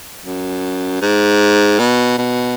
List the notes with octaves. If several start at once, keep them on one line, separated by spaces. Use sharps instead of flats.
F#2
G#2
B2
B2